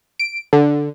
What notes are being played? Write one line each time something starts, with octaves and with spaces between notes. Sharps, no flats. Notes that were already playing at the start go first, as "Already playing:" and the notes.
D7
D3